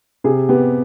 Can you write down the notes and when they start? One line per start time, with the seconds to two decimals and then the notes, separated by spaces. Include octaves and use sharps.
0.24 C3 G#4
0.49 B3 G4